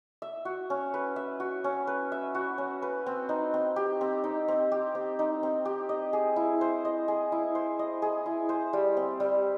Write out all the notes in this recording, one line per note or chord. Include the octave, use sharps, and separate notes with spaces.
E5
F#4
C#4
B4
E5
F#4
C#4
B4
E5
F#4
C#4
B4
C4
D#4
C4
G4
C4
D#4
C4
G4
C4
D#4
C4
G4
D#5
G#4
E4
C5
D#5
G#4
E4
C5
D#5
G#4
E4
C5
G3
C4
G3